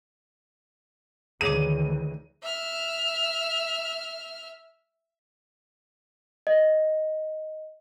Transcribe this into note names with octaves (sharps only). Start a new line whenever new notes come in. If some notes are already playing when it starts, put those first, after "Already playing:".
D2 D#3 E3 G#4 C#5 D6 D#7
E5 F6
D#5